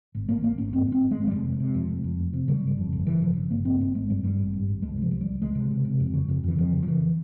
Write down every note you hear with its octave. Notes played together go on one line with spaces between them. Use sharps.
G#1
G#1 A#3
G#1 A#3
G#1 C#4
G2 C4
G2
C4
G#1
G#3
G#1
G3
F1 G#3
C3
C3
F2
F1
F2
F1
C3
C#3 G3
G1 G3
F2
G1
C#3 E3
G1 F3
C#3
G1 A#3
G2 C4
G#1 C4
G#1 G#3
G2 G3
G2 G3
G#1
G2
G#1
C#2 G#3
C3 F3
C#2
G3
C#2
C#2 G#3
C3
C3
C3
F2
C#3
F2
F2 E3
F2 F3
C#3
F3
C#3 E3